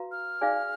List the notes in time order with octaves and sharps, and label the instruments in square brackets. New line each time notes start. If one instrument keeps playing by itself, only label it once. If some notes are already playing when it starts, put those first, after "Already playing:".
Already playing: [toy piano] F#4 B4 F5 A#5
[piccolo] F6
[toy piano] D#4 G#4 D5 F5 G#5